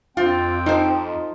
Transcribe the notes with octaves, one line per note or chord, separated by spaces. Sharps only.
F2 C4 F4 G5
F3 D#4 C5